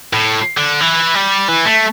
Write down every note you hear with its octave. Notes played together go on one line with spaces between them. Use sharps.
A2
D3
E3
G3
E3
A3